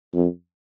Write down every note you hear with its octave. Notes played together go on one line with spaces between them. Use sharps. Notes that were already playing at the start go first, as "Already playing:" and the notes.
F2